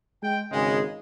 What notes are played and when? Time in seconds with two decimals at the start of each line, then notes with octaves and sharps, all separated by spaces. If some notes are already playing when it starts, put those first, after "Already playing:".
0.23 G#3 G5
0.52 G#1 C#3 G#3